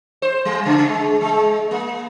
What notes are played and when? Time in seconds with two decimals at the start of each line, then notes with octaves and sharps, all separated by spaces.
0.22 C5
0.45 G3
0.65 C#3
0.88 G#3
1.21 G#3
1.71 A#3